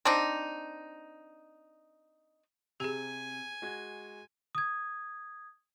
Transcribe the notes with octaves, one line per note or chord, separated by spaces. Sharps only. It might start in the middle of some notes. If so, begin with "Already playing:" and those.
C4 D4 D#4
C3 G4 G#4 G#5
G#3 F#4 G#6
D#6 G#6